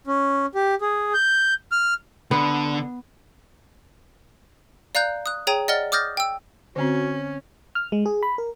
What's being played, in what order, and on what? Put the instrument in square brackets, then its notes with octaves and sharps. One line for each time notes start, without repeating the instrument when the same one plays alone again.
[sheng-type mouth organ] C#4
G4
G#4
G6
F6
[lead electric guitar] D3 [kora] B3
[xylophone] D5 F5 A#5 F#6 G6
D#6 F#6
G#4 C#5 G5 A#5 D#7
D5 D#5 F#5 F6 A6 G7
D6 D#6 F6 G6 A6 A#6
G5 E6
[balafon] D3 C4 [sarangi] C#4 [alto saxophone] F#4
[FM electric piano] F6
G#3
G#4
B5
A#4